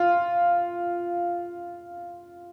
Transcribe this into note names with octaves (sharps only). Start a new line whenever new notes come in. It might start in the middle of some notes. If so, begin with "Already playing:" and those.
Already playing: F4